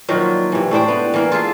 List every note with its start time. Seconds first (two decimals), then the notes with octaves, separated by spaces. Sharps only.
0.09 A#2 D#3 F3 F#3
0.52 C3 E3
0.71 A2 D4 C5 G5
0.88 B3
1.14 E3 A#3
1.32 F4 G#4 A4